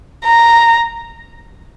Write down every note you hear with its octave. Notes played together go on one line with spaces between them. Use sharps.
A#5